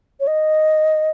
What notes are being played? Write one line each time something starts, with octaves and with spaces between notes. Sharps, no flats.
C#5
D#5